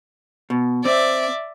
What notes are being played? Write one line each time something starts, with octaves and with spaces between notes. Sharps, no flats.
B2
C4 D5 E5